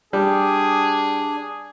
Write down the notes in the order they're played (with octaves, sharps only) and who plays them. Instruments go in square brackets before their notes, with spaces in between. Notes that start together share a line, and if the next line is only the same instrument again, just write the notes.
[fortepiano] G3 [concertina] D4 [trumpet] G#4